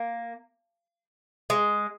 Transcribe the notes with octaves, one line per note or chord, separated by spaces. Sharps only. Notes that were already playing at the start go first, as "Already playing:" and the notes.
Already playing: A#3
G#3